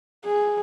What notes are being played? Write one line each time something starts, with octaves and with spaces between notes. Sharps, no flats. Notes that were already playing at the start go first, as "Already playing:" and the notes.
G#4